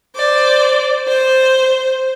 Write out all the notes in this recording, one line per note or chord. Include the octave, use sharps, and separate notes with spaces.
C5 D5
C5